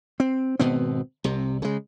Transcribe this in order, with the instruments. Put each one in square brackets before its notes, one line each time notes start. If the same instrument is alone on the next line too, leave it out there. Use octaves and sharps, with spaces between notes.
[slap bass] C4
G#1 B2 B3 C4
C2 C3
C#3 G#3